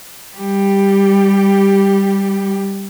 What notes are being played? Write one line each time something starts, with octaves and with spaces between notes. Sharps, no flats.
G3 G4